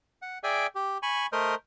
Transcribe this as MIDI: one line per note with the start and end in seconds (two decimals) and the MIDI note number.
0.22 0.38 78
0.43 0.67 68
0.43 0.67 74
0.43 0.67 76
0.43 0.67 79
0.43 0.67 80
0.75 0.98 67
1.03 1.26 80
1.03 1.26 83
1.03 1.26 85
1.32 1.55 57
1.32 1.55 70
1.32 1.55 72
1.32 1.55 75